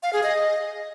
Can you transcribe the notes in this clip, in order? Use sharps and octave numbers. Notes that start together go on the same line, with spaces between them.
F5
G#4
D#5